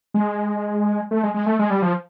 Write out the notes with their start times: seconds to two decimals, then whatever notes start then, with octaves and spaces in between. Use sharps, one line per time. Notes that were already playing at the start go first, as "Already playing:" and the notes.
0.14 G#3
1.11 A3
1.23 G#3
1.34 G#3
1.46 A3
1.59 G#3
1.70 G3
1.82 F3